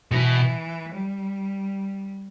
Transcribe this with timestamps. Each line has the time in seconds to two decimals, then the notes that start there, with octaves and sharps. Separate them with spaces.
0.11 B2 E3
0.94 G3